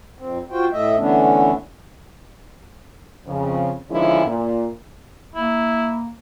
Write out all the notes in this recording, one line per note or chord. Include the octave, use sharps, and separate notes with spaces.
F2 C4
F4 F#4 C5 G5
A2 A3 D#5 E5
D3 E3 A3 B3 C#4 D4
F2 C#3
D3 D#3 F3 G#3 C#4 E4
A#2
A#3 E4